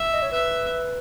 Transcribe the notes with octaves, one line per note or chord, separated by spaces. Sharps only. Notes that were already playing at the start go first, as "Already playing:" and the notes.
Already playing: E5
D#5
C#5
B4 E5